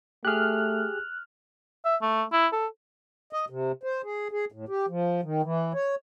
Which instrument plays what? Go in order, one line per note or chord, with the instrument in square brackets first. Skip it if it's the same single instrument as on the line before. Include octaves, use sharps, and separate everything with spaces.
[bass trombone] A3 [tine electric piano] G4 G#4 [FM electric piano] F6 F#6
[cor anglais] E5
A3
E4
A4
[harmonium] D#5
C3
C5
G#4
G#4
A2
G4
F3
D#3
E3
C#5